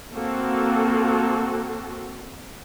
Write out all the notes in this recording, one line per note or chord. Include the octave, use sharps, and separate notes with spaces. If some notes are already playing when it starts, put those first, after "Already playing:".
A#3 C4 F#4 A4